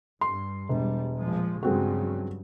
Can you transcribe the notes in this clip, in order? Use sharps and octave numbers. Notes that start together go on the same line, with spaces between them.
G2 C6
E1 G3
A#2 F3 G#3
G2 C#3 F#3 G#3 C4 F#4